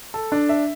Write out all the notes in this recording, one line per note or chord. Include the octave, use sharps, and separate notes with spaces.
A4
D4
E5